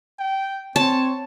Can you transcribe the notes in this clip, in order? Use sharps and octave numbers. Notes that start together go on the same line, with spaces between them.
G5
C4 C#5 A5